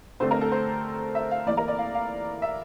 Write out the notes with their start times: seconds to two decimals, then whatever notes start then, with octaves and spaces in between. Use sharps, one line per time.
0.20 D3 A3 C4 C5
0.31 A#4
0.41 A4
0.52 C5
1.15 E5
1.31 F5
1.47 E3 A#3 D5
1.57 A#4
1.68 D5
1.78 F5
1.94 F5
2.42 E5